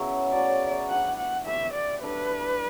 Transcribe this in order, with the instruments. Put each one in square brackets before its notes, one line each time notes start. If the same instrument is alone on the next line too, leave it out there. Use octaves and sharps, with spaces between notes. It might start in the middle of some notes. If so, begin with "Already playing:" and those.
Already playing: [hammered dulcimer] C#3 F#3 B3 E4
[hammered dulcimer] A2 F#3 C#4 [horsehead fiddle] D5
[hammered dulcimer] G3 D4 G4 [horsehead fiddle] F#5
[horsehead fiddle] F#5
[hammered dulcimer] E3 A3 E4 G4 [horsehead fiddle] E5
[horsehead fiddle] D5
[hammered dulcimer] G3 D4 A4 [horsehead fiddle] B4